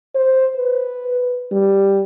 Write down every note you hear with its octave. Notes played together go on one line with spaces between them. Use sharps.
C5
B4
G3